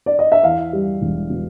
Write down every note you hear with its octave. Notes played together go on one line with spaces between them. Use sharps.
D5
D#5
E5
E2 F5
G3
E1
B2